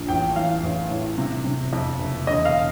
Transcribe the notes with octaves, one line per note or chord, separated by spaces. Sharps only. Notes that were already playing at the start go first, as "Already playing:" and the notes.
Already playing: A#1
A1 G5
E3 F5
A1
A2
C3
C3
F2
F#1
E1 D#5
F5